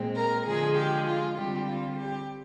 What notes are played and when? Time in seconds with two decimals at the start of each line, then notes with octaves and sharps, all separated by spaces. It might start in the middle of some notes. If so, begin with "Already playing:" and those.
Already playing: A#2 G#3 C4
0.16 A#4
0.46 D3 F3 G#3 G#4
0.77 G4
1.07 F4
1.37 D3 G3 C4 F4 G4
1.67 F4
1.97 G4